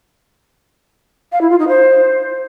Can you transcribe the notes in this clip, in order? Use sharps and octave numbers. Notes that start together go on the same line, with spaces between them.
F5
E4
F4
D#4
C5